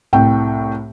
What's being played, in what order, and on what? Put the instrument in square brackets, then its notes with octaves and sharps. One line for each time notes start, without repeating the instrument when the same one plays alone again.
[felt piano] C2 A2 G5